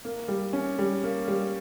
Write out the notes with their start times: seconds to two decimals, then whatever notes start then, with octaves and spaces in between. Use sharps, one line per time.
0.05 A#3
0.28 G3
0.53 C#4
0.79 G3
1.03 A#3
1.28 G3